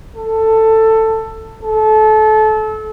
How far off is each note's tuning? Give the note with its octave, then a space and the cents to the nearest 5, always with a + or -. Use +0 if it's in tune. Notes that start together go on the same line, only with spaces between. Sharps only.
A4 +10
A4 -30